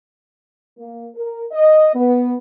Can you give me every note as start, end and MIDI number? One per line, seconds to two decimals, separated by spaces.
0.77 1.07 58
1.15 1.44 70
1.52 1.89 75
1.94 2.35 59